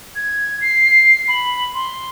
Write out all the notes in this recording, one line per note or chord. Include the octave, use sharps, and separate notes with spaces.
G#6
C7
B5
C6